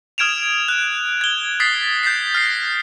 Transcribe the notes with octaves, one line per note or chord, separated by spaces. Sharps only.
D#6 F6 G#6 D7 E7 F7
F#6
G#6 G7
D#6 A6 B6 C7
G6 A6 B6 C7
F6 A#6 C7